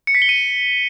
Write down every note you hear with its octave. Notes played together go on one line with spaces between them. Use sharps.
C#7
B6
G7
D#7